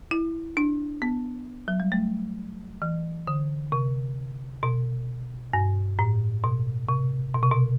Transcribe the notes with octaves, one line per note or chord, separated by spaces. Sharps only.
E4
D4
B3
F#3
G3
A3
E3
D3
C3
B2
G2
A2
B2
C3
B2
C3
B2